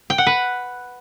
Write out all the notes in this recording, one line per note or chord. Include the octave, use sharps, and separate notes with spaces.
G5
F#5
B4